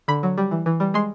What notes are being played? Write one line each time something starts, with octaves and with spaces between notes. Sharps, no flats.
D3 B5
F#3
G3
E3
E3
G3
G#3 C6